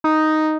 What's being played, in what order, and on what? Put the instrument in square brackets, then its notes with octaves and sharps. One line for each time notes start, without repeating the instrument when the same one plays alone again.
[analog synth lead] D#4